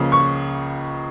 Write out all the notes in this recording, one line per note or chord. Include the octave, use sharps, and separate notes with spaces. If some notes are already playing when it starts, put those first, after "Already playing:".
Already playing: C#2 C#3 F3 A#3
C#6